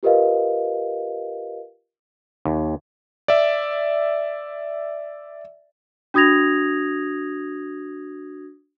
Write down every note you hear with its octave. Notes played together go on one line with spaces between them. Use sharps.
F4 G4 A#4 B4 D#5 F5
D#2
D5 E5
D4 F#4 D#6 G#6 A#6 F7